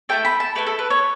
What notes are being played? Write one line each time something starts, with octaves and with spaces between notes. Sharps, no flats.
A3 E4 A4 G5
B5
A5
A3 E4 A4 B4
A4
B4
C#5